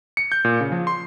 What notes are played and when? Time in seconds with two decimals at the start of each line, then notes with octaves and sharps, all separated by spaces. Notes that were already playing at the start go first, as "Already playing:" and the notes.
0.17 C#7
0.32 G6
0.45 A#2
0.61 C#3
0.72 F3
0.87 C6